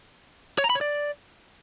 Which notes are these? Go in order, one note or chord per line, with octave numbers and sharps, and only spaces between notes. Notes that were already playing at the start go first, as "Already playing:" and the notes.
C#5
A#5
B5
C#5
D5